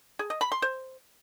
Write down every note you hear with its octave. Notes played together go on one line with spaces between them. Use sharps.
G#4
D#5
B5
C6
C5